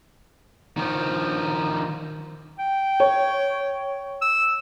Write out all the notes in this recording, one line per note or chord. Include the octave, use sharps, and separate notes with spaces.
D#3 F3
G5
C#5
E6